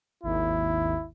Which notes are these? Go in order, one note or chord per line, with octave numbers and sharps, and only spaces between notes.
G#1 D#2 E4